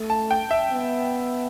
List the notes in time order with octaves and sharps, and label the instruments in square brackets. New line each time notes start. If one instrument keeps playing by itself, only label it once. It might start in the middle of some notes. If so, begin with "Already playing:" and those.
Already playing: [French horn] A3
[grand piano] A5
G5
E5
[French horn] B3